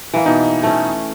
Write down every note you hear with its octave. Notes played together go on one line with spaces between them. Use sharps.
E3 A#3
B2 D#4
A3 C#4